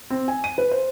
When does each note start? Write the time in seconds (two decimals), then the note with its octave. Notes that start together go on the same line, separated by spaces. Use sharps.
0.10 C4
0.28 G#5
0.44 D#7
0.58 B4
0.71 C5